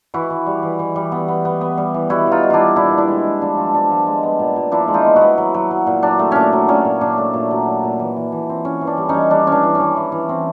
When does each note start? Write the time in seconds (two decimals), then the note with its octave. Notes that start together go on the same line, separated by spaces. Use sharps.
0.14 E3 E4 F#4
0.30 E3
0.46 G3
0.63 E3
0.79 E3
0.96 G3
1.12 B3
1.28 B3
1.45 B3
1.61 B3
1.78 G3
1.94 E3
2.10 G3 E4 F#4
2.27 E3 D#4 F4
2.43 G3
2.50 D4 E4 F4
2.59 G3
2.76 A#2 D4 E4
2.91 B3
2.98 D4 E4
3.08 G#3
3.25 G#3
3.42 F3 D4
3.58 F3
3.73 F3 D4
3.91 F3
4.07 G#3
4.23 B3
4.39 A#2
4.56 A#2
4.72 F3 D4 E4
4.88 G#3
4.94 D#4 F4
5.04 B3
5.16 E4 F#4
5.21 B3
5.38 F#3
5.54 F#3
5.71 F#3
5.87 A#2
6.03 F#3 D4
6.19 A3
6.32 A#2 C#4 D4
6.53 F#3
6.68 A#2 C#4
6.85 A#2
7.01 A#2 D4
7.18 A3
7.34 A#2
7.51 F#3
7.66 F#3
7.83 A#2
7.99 E3
8.16 E3
8.32 E3
8.49 C4
8.65 E3 C#4
8.81 E3
8.87 D4
8.97 G3
9.09 C#4 D#4
9.14 G3
9.31 G3 D4
9.47 E3 C#4 D4
9.63 E3
9.75 C#4
9.80 E3
9.97 E3
10.12 E3
10.29 C4